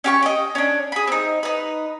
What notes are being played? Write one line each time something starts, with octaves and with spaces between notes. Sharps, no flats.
C#4 G4 C#6
D#5 G5
C#4 D4
G#4 B5
C4 D#4
D#4 B4